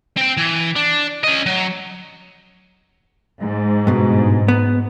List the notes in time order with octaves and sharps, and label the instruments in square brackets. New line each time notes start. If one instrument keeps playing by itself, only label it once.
[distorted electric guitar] C4 G5
E3
D4
C#4 D#5
F#3
[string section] G#2
[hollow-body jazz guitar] G2 B2
B3